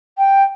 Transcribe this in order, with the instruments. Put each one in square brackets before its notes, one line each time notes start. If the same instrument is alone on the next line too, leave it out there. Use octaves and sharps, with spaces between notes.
[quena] G5